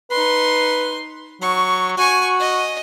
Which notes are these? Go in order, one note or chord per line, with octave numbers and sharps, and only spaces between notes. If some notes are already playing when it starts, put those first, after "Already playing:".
D#4 B4 C6
F#3 C#6
F#4 G#5 C#6
D#5